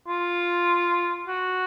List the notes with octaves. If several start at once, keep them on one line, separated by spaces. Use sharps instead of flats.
F4
F#4